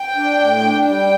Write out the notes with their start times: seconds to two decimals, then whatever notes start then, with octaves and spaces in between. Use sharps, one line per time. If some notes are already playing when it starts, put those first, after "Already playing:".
Already playing: G5
0.17 D4
0.39 A2
0.63 D4
0.86 G3 G5